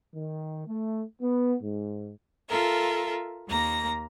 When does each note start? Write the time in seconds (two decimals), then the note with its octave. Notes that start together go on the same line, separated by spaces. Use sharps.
0.14 D#3
0.68 A3
1.21 B3
1.62 G#2
2.48 F4 A4 A#4 E5
3.48 D#2 A#3 A#5 A#6